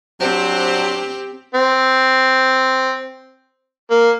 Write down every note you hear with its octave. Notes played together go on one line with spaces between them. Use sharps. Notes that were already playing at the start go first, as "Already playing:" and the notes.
F#3 C4 D4 G4 C5
C4
A#3